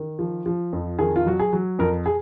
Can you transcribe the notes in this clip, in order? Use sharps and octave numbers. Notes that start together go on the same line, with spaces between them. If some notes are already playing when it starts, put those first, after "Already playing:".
Already playing: D#3
F3
F3
F2
D#3 G#4
F4
F#3 F#4
G#4
F#3
F2 A#4
G#4